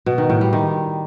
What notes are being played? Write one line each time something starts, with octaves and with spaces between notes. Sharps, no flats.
B2
D#3
A2
G3
D#3